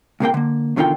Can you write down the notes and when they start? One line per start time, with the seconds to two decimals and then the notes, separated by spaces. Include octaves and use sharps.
0.20 C#2 C3 A#3 G5
0.34 D3 A#3
0.76 E2 B2 D3 D#3 F4 G5